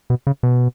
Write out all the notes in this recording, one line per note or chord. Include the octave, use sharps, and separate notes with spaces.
B2
C#3
B2